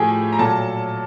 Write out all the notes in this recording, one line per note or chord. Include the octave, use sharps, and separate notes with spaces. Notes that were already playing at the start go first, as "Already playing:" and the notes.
Already playing: A2 F3 A3 G4 G#4 G5 G#5
A#5
A#2 F#3 A4 A5